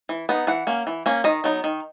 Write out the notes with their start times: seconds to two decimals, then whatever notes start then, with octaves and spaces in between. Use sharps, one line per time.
0.09 E3
0.29 B3 D#4
0.47 E3 F#5
0.67 A#3 C#4
0.87 E3
1.06 A#3 C#4
1.24 D#3 D#5
1.44 F#3 B3 D#4
1.64 D#3